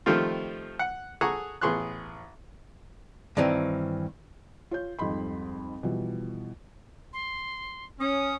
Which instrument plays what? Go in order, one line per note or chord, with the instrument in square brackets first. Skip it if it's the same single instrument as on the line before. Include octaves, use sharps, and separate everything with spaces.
[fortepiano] D#3 F3 G3 A3 C4 F4
F#5
G#4 A4 F#5 G#5 A#5 C#6
A1 B3 G#4 C6 C#6 F#6
[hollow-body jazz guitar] G2 D#3 E3 C4
[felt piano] F4 C#5 G6
F2 G#2 G3 D#5 B5 C6
B2 E3 F3 G3
[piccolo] C6
[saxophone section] C#4 [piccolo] D#6